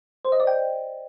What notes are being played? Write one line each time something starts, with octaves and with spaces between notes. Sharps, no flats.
C5
D#5
D5
G5